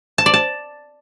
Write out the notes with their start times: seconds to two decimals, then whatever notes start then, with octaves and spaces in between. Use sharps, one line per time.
0.18 A5
0.26 D5
0.34 A5